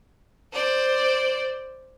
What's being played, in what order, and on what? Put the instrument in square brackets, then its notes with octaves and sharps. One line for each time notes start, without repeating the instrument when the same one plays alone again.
[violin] C5 D5